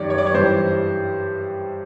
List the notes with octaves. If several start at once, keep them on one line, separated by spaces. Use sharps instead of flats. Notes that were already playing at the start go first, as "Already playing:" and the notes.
Already playing: F#2 D#3 G3 C#5 D5
C#5
D5
C#5
G2 E3 G3 C5